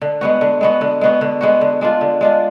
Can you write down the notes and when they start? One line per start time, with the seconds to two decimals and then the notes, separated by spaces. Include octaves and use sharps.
0.01 D3
0.21 G#3 B3 F#4
0.41 D3
0.61 G#3 B3 F#4
0.81 D3
1.01 G#3 B3 F#4
1.21 D3
1.41 G#3 B3 F#4
1.61 D3
1.81 G#3 D4 F4
2.01 D3
2.21 G#3 D4 F4